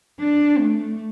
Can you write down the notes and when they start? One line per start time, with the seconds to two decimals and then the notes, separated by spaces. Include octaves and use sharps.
0.20 D4
0.58 A3